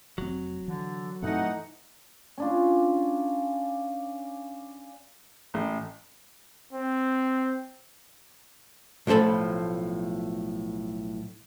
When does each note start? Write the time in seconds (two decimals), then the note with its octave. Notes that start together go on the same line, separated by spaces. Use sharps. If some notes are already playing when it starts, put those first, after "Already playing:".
0.18 F1 F#3 C4
0.68 D3 E3
1.22 G2 B2 E3 A3 C4 D#4 F#5
2.38 C#4 D4 F4
5.54 A1
6.73 C4
9.07 B1 A2 F3 A4 B5